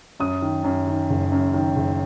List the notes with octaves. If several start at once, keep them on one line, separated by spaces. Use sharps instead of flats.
F#2 D#6
D#3
F#2
D#3
F#1
F#2
D#3
F#1